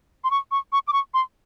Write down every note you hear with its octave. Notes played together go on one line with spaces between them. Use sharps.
C6
C#6
C#6
C#6
D6
C#6
C6